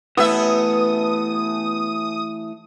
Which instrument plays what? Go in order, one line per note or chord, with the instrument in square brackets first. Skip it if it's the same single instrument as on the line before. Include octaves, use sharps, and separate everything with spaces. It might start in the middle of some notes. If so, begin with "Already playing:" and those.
[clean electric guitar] E3 A3 [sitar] B3 E5 [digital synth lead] D#6